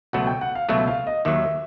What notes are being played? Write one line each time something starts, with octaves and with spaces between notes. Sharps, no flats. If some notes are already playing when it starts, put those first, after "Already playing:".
C#2 B2 F#3 A3 F#5
G5
F#5
F5
C#2 B2 F#3 A3 E5
F5
D#5
D#2 D#3 F#3 E5